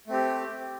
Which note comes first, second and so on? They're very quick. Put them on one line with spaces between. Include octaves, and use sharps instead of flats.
A3 C4 G4